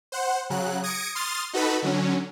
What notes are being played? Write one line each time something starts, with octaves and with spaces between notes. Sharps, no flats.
C5 F#5
C#3 F#3 F#6
D#6 G#6 A#6 C#7 D7
C6 D#6 F6 A6
D#4 F#4 A4 B4 B5
D3 F#3 C#4